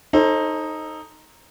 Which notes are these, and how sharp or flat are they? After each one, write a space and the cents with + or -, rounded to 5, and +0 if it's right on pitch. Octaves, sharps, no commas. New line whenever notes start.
D#4 +0 A4 +0 C5 +30